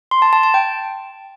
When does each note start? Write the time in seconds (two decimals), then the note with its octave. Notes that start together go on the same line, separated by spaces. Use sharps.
0.11 C6
0.22 A5
0.33 A5
0.43 A5
0.54 G5